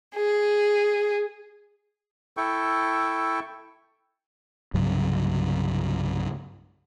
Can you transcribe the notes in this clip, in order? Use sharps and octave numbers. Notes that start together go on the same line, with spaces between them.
G#4
E4 A4 G5 C#6
C2 G2 C#3 F#3